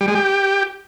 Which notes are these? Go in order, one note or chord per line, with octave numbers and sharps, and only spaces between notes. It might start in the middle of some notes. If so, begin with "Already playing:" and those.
G3
G#3
G4